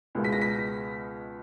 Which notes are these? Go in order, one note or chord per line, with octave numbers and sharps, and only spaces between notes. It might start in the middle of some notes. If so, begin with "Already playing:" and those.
C#2 B2 G#3 B3
B6
A#6
B6